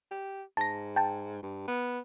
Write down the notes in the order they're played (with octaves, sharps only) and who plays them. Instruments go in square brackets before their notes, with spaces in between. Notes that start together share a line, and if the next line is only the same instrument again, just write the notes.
[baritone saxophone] G4
[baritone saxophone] G#2 [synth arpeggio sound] A5 A#6
[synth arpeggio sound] G5 A5
[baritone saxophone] G2
B3